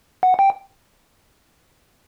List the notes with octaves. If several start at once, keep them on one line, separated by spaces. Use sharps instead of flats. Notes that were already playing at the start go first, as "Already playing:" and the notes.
F#5
G5